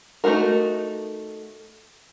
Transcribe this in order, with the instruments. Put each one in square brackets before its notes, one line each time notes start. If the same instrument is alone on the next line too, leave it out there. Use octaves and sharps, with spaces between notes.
[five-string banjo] A3 C4 D#4 F#4 A#4